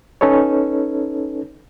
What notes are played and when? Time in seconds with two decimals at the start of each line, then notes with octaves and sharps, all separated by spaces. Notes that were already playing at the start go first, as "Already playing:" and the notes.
0.21 C#4 D#4 A4 B4 C#5